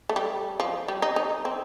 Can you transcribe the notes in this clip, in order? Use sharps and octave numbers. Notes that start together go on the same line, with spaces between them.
A3
G3
F3
G3
D#4
D#4
C4